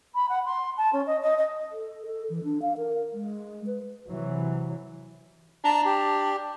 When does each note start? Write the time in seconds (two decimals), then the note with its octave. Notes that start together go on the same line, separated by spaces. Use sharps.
0.14 B5
0.28 F#5
0.45 C6
0.77 A5
0.93 C#4
1.06 D#5
1.22 D#5
1.37 D#5
1.72 A4
2.06 A4
2.30 E3
2.44 D4
2.62 F5
2.77 A#4
3.13 G#3
3.67 B4
4.09 C3 E3 F#3
5.65 D4 A5 A#5
5.85 G4